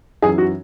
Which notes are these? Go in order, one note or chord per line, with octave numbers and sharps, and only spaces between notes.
F#2 E3 G#4
F#4